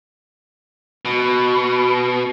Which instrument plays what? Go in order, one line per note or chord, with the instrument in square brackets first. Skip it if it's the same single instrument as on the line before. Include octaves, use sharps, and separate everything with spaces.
[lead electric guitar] B2